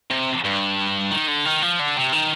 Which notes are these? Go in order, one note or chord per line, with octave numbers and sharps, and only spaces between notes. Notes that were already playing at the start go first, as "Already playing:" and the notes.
C3
G2
D#3
D3
D#3
F3
D3
C3
D#3